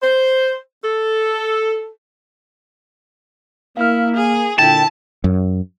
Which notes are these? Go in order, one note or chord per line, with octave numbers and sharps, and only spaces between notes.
C5
A4
A#3 E4 F5 F6
G#4
A#2 D3 E4 G5 A5
F#2